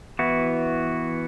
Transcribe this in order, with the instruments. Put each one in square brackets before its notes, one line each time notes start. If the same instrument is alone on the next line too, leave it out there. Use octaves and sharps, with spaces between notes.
[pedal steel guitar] E3 B3 E4 F#4